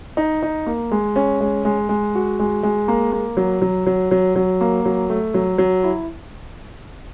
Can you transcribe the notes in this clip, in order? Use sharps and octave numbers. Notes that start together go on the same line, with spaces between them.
D#4
D#4
A#3
G#3
C#4
G#3
G#3
G#3
F#4
G#3
G#3
A#3
A#3
F#3
F#3
F#3
F#3
F#3
A#3
F#3
A3
F#3
F#3
E4